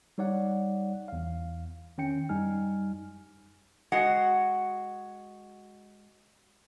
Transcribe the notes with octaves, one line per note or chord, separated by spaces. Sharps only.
G3 D#4 C#5 D5 F#5
E2 F5
D#3 C#4 G5 C#7
F#2 G3 D#4 G#5 F6
G#3 F#4 F#5